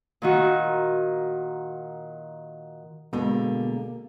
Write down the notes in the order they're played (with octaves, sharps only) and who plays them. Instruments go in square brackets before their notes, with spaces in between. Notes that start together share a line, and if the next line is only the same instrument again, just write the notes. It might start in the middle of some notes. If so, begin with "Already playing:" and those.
[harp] A#2 D#3 F#4
[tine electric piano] B2 [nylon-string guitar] D3 G#3 [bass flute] A#3